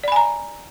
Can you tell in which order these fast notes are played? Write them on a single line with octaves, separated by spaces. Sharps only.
D5 B5 G#5 A#5